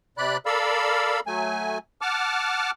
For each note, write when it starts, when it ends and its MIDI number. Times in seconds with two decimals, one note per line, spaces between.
0.18 0.37 48
0.18 0.37 74
0.18 0.37 83
0.18 0.37 90
0.46 1.20 69
0.46 1.20 70
0.46 1.20 74
0.46 1.20 77
0.46 1.20 83
0.46 1.20 88
1.27 1.78 54
1.27 1.78 57
1.27 1.78 80
2.01 2.71 78
2.01 2.71 81
2.01 2.71 86
2.01 2.71 89